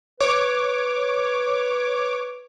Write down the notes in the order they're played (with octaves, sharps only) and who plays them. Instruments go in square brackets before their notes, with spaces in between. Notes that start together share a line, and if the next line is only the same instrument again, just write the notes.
[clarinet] B4 [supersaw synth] C#5 D6